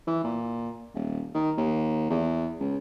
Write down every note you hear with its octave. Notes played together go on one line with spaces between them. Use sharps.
E3
A#2
D#1
D#3
D#2
E2
C#2